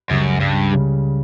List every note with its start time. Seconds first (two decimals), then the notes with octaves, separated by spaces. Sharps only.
0.09 C#2 F#2 C#3 G3
0.40 G2
0.71 C#2 C#3 G3